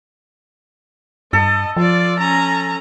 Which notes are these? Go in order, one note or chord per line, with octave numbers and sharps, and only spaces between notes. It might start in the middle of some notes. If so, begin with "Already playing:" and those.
G2 A4 D#5
F3 F4 D5
C#4 A#5